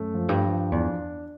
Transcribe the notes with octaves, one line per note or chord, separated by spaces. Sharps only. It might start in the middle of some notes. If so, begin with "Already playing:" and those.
Already playing: F#2 A3
F3
G2
F3
E2 D4